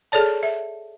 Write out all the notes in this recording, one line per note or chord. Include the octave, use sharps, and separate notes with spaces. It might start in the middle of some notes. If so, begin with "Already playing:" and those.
G#4 A4 C#5 D5 A5
E5